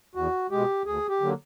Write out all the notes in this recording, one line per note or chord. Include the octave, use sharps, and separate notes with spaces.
E2 F#4
B2 G#3 G4
D2 G#4
G4
D3 F#3 A#3